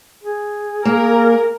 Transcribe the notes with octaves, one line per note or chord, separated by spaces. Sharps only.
G#4
A#3 A#4